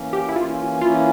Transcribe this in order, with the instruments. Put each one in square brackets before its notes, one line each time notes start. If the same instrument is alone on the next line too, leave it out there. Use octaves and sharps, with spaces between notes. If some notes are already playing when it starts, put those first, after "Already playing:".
Already playing: [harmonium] E3 A#3 C#4
[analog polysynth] G4
E4
[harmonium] E3 A#3 C#4 [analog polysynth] F4
[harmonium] E3 A#3 C#4 E4 [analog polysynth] F4